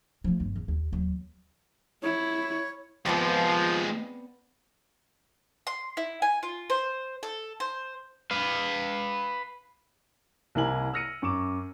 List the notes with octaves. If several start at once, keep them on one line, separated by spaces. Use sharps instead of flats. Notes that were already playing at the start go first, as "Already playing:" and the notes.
F3 A3
G1 D#3
E2
D#2
D#2 F#3
E4 C#5
D#2 F3 G#3 B3 C4 D5
C6
E4
G#5
F4
C5
A4
C5
B4 F5
C2 A#3 E4 A#4 G#5 F#7
E6 F6 A#6 C#7 D#7
F#2 C#6 D6 E7